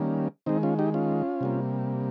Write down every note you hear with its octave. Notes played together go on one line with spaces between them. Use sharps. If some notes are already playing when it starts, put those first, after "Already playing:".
Already playing: D#3 G3 A#3 C#4
D#3 G#3 C4 D#4
C#4 F4
D#4 G4
C#4 F4
C3 G3 A#3